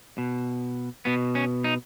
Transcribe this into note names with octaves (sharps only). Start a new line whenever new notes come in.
B2
B2 B3
C#4
D#4